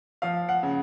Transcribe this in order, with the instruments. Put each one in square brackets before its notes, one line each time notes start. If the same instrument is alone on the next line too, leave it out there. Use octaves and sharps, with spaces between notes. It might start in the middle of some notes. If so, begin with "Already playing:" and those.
[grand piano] F3 F5
F#5
C#3